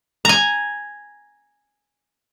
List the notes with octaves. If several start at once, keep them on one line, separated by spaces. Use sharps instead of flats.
G#5 A#5